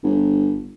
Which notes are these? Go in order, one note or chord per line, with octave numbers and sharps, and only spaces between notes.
G1